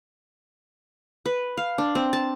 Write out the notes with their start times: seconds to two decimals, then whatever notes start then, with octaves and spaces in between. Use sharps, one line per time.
1.26 B4
1.57 F5
1.78 D4
1.95 C4
2.13 A5